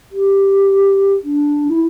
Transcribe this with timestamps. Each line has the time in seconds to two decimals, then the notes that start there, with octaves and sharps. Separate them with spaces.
0.12 G4
1.24 D4
1.69 E4